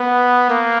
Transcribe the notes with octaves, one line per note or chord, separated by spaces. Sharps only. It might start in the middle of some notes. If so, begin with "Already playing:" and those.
Already playing: B3
A#3